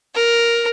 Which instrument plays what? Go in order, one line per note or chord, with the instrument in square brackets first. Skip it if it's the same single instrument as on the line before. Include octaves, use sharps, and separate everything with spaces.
[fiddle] A#4